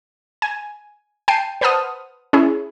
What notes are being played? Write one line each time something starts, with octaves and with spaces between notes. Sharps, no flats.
G#5
G5 A5 C7 D#7
B4 C5 F#5 A5 D#6 F6
C#4 E4 G#4